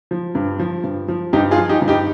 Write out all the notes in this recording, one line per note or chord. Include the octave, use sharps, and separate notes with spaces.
F3
G2
F3
G2
F3
G2 D#4 G4
F4 G#4
F3
D#4 G4
G2
D#4 G4